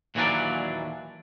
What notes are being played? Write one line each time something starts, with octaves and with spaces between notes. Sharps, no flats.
D#2 A#2 E3 F#3 D4 D5